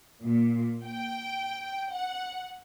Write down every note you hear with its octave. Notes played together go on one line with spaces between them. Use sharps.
A#2
G5
F#5